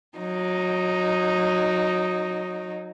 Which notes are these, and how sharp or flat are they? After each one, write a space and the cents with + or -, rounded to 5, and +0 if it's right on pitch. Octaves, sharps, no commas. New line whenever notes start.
F#3 -25 D#4 +0